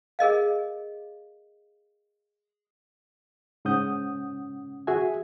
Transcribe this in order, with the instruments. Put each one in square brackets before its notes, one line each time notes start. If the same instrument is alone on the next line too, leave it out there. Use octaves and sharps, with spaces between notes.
[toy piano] G#4 A#4 D#5 F5
[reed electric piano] G#2 C#3 C#4 F#5 D#6 G6
F#4 G#4 E5 G#5